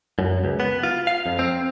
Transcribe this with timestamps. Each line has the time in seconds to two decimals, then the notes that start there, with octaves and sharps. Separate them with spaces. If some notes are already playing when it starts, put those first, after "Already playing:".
0.19 F#2
0.44 C#2
0.60 B3
0.83 F4
1.07 F5
1.26 F2
1.39 C4